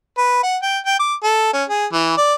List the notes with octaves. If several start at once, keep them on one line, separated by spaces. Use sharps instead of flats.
B4
F#5
G5
G5
D6
A4
C#4
G#4
E3
D5